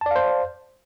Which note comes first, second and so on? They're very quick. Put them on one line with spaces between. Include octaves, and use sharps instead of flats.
A5 D5 F5 C5